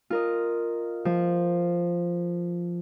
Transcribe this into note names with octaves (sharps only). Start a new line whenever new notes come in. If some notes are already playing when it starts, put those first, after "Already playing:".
F4 A#4 D#5
F3